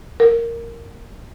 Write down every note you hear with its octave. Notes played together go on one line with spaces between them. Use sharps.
A#4